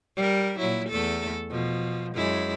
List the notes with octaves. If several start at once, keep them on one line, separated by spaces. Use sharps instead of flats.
G3 A#4
A#2 F#3 E4
E2 A3 A4
B2 F3
F#2 G#3 E4